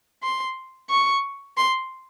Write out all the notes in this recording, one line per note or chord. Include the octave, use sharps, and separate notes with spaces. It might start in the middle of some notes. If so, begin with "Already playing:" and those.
C6
C#6
C6